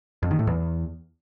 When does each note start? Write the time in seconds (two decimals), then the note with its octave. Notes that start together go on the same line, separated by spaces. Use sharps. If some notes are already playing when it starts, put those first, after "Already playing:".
0.23 F2
0.31 D#3
0.39 A2
0.47 E2